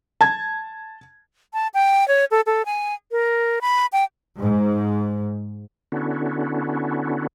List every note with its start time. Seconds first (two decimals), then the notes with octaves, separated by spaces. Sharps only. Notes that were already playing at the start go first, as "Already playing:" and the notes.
0.21 A5 G#6
1.53 A5
1.74 G5
2.08 C#5
2.31 A4
2.46 A4
2.66 G#5
3.11 A#4
3.61 B5
3.93 G5
4.40 G#2
5.92 D3 B3 C#4 D4 E4 F#4